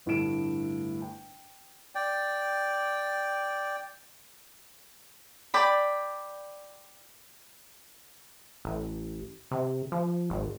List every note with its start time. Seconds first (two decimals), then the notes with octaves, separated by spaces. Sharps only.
0.06 G1 A2 D3 A3 D7 E7
1.02 G5
1.95 D5 G5
5.54 D5 G5 B5
8.65 A1
9.51 C3
9.92 F3
10.30 G#1